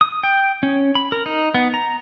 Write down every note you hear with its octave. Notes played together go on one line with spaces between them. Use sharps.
D#6
G5
C#4
B5
A#4
D#4
B3
A#5